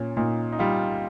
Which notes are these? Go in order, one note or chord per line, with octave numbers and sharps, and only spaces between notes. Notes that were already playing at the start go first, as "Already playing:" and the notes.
Already playing: A#2 C#4
A#2 D#4
D#4
G3 F4